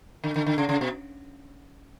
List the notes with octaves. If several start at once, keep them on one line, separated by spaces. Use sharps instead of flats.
D3
D3
D3
C#3
C#3
B2